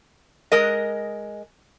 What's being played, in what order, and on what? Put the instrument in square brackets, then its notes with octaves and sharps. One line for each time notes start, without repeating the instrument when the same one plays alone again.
[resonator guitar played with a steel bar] G#3 A#4 D#5